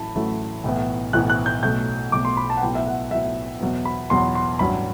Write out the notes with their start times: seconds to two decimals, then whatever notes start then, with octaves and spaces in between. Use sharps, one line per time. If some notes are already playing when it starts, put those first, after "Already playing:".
Already playing: A1 A2 F#3 A3 A5 B5
0.15 A1 A2 F#3 A3
0.64 B1 A2 E3 B3
1.13 B1 A2 E3 B3 F#6
1.30 F#6
1.46 G6
1.63 B1 B2 F#3 A3 G6
2.12 B1 B2 F#3 A3 D6
2.25 C6
2.37 B5
2.50 A5
2.57 F#5
2.61 B1 A2 F#3 B3 G5
2.75 E5
2.87 F#5
3.11 B1 A2 F#3 B3 E5
3.60 E2 B2 F#3 B3
3.85 B5
4.10 E2 B2 F#3 B3 C6
4.35 C6
4.59 A1 G2 F#3 B5